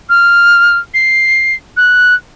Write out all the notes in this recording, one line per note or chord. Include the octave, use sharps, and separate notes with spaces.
F6
C7
F#6